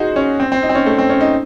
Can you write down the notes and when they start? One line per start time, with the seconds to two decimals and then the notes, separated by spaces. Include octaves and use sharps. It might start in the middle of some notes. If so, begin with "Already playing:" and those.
Already playing: D#4 F#4 G#4 C5
0.16 C#4
0.40 C4
0.52 C4
0.63 D#4
0.69 C4
0.75 C#4
0.86 A3
0.98 C4
1.09 C#4
1.21 D#4